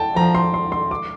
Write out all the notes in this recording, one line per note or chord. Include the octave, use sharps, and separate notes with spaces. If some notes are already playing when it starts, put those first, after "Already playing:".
Already playing: G5 A5
F3 A#5
C6
C6
C6
D6